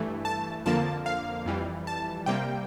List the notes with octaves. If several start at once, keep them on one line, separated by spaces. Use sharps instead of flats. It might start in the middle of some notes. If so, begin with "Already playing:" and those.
Already playing: G2 E3 A3
A5
F2 D3 F3 A#3 A5
F5
F2 E3 G3
A5
C3 G3 A#3 G5